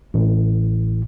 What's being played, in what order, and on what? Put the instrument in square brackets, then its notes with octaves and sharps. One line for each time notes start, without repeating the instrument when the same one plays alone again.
[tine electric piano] A1 A2